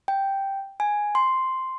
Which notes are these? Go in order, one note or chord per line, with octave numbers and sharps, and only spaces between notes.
G5
G#5
C6